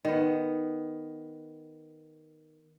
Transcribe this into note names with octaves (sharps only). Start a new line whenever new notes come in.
D#3 B3